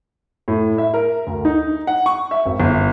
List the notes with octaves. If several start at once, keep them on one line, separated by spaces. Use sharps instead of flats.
A2
E5
A#4
D2
D#4
F#5
C#6
E5
G#1
G1